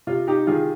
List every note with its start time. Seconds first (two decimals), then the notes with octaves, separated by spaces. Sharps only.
0.07 C3 F4
0.27 D#4 G4
0.47 D#3 F4 G#4